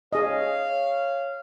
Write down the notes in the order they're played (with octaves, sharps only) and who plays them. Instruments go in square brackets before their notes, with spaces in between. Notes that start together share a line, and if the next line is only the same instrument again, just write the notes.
[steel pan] G#4 D#5 [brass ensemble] C#5 F5